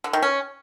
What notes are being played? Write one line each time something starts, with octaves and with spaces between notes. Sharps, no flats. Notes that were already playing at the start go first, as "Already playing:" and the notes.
D3
D#3
C#4